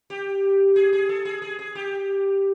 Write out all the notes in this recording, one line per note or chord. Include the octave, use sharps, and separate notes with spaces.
G4
G#4
G#4
A4
G#4
G#4
G#4
G4